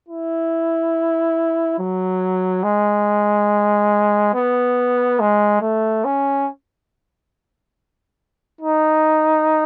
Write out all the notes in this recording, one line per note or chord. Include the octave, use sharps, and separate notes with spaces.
E4
F#3
G#3
B3
G#3
A3
C#4
D#4